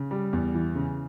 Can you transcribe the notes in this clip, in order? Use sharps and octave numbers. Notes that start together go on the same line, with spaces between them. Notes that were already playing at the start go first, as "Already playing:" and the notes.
Already playing: C#3
G3
E2
E3
C#3